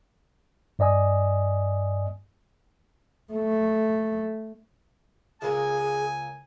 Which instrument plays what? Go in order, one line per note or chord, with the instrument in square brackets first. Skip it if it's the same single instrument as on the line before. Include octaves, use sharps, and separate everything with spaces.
[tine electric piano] G2 D5 D#5 G#5 D#6
[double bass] A3
[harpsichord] C#2 A#3 [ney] G#4 [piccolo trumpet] G#5